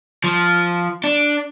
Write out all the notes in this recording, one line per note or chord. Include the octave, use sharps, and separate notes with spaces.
F3
D4